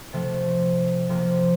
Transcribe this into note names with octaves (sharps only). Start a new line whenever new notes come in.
C3 F3 A3
C3 F3 A#3